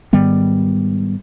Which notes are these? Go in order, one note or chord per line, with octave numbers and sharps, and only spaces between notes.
G#2 D#3 G3 B3